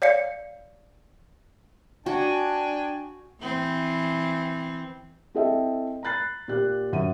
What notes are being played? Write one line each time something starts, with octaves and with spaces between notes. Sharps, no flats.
C#5 D5 F5 C#7
D4 F#4 G5 G#5
E3 C4
C4 E4 A4 D#5 E5 G5
A#5 B5 F#6 A6 C7
A#2 A#3 G4 F#6
F#2 E5 F#5 D#7